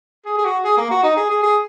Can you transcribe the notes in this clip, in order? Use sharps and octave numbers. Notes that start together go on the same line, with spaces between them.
G#4
G#4
F#4
G#4
A#3
F#4
D#4
G#4
G#4
G#4